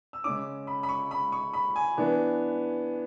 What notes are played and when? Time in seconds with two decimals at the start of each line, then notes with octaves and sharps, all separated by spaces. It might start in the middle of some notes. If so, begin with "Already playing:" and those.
0.13 E6
0.24 C#3 G#3 C#4 D6
0.67 B5
0.83 B5
0.89 C#6
1.11 B5
1.32 C#6
1.53 B5
1.76 G#5
1.97 E3 B3 D4